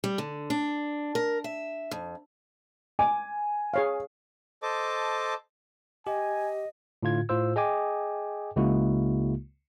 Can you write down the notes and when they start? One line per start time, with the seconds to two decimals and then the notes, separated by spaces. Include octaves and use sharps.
0.04 G3
0.18 D3
0.50 D4
1.15 A#4
1.44 E5
1.91 F2
2.99 G#5 D6
3.74 G#4 C#5 F5
4.63 A4 C5 D#5 A5 D6
6.07 G4 D#5 G#5
7.03 A2 D3 F4 G#6
7.29 A2 F4 C5 E6
7.56 G#4 D#5 G5 G#5 D6
8.56 C#2 C#3 G#3 A#3 E4 F#4